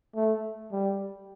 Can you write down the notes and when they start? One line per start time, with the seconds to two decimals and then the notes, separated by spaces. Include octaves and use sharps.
0.15 A3
0.72 G3